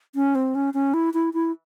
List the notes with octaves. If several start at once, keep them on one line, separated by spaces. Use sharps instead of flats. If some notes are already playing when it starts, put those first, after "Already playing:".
C#4
C4
C#4
C#4
E4
E4
E4